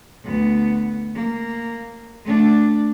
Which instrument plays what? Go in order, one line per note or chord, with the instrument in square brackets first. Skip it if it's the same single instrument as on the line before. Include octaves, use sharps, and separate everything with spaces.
[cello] D2 B3
A#3
A3 D4